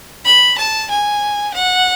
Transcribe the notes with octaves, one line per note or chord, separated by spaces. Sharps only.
B5
A5
G#5
F#5